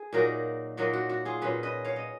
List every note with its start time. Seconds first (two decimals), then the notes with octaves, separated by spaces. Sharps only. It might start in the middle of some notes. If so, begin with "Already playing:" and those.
Already playing: G#4
0.13 A#2 F#3 A#3 D#4 F#4 A#4
0.77 A#2 F#3 A#3 D#4 F#4
0.93 F#4
1.09 F#4
1.25 F4 G#4
1.41 A#2 F#3 C#4 G#4 B4
1.63 B4 D#5
1.85 C#5 F5
1.96 D#5